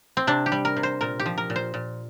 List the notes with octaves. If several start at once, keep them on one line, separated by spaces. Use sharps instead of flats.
C4
C3 D4
G4
G3
A#4
C3
C5
A#2 A#4
G4
F3
A#4
A#2
C5
A#2